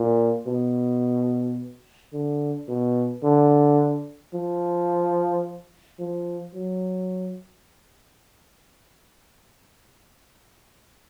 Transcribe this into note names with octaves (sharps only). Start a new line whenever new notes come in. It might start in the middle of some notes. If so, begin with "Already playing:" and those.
Already playing: A#2
B2
D3
B2
D3
F3
F3
F#3